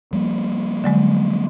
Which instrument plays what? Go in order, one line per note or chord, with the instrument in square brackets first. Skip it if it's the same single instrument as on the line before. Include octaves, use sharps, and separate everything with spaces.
[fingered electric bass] F3 G3 A#3
[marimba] D3 F#3 G#3